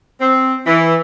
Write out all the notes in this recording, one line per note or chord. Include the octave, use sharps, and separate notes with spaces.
C4
E3